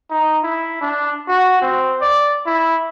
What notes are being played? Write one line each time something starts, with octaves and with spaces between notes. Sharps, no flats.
D#4
E4
D4
F#4
C4
D5
E4